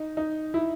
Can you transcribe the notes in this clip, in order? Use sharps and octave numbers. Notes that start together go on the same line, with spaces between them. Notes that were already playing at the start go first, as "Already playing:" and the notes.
Already playing: D#4
D#4
E4